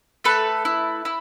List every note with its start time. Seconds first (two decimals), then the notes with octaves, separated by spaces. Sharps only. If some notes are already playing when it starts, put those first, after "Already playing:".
0.24 A3 A4 B4
0.65 E4
1.05 E4